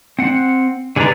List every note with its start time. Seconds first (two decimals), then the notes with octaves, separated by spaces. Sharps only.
0.19 C4 F#5
0.96 D3 G#4 B4 D5 A#5